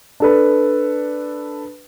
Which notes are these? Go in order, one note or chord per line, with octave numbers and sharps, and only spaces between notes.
D4 A4 B4